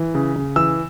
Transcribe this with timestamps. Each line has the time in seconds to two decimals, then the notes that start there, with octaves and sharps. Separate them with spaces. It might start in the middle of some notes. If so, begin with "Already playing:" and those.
Already playing: E3
0.15 C#3
0.36 C#3
0.56 E3 E6